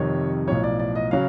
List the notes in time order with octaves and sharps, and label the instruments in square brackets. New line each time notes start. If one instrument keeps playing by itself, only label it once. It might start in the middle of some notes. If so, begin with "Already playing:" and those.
Already playing: [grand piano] F2 C3 D#3 G3 C#5
B1 A2 F3 C#5
D5
D5
D#5
C#3 F#3 F5